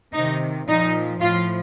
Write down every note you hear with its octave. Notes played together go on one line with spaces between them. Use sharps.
C3 D#3 D#4
A#2 F3 D#4
A2 F3 F4